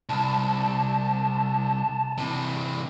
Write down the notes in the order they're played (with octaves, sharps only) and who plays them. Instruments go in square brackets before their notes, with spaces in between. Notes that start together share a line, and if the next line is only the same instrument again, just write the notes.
[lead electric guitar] C2 [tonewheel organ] A5
[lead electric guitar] C3 E3